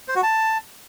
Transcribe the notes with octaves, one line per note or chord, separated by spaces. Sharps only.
C5
F#4
A5